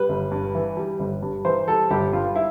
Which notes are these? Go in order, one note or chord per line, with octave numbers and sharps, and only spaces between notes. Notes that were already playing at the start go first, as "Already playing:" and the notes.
Already playing: G3 B4
G1
G2
E3
G3
G1
G2
E3 C5
G3 A4
G1 G4
G2 F4
E4